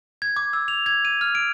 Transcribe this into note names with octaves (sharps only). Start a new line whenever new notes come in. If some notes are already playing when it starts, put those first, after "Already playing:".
G#6
D6
E6
F7
G#6
D#7
F6
D7